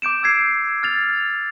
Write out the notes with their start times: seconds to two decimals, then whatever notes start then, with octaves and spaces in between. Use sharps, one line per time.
0.02 D6 G6 D7 E7
0.23 E6 G#6 C7
0.83 F6 A6 F7